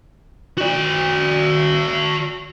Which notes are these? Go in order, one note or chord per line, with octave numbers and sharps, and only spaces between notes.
F#4 D5